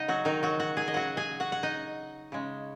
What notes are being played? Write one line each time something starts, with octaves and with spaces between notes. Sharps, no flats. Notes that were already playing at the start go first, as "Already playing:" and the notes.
Already playing: C#3 G#3 D#4 D#5 F#5
F#3 F#4
D#3 D#4
F#3 F#4
F#4 F#5
G#4 G#5
D#5
C#3 F#3 F#4 F#5
G#4 G#5
F#4 F#5
F#5
D#4 D#5
C#3 G#3